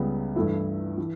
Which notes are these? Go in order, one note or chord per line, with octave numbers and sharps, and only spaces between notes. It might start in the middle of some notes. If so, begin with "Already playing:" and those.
Already playing: C#2 C#3 G3 B3
G2 E3 A3 E4
E3